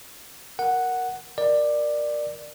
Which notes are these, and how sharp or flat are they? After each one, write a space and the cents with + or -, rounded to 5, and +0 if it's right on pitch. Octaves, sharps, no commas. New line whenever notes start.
A#4 +0 F#5 +0
A#4 +15 D5 +15